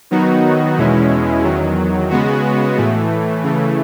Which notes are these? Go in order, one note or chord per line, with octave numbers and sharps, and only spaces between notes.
D#3 F#3 B3 D#4 F#4
E2 B2 G#3 C#4 E4
E2 D#3 F#3
C#3 G#3 B3 F#4
A2 E3 A3
C#3 E3 A3